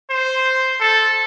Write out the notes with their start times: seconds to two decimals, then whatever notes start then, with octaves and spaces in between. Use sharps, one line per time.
0.10 C5
0.80 A4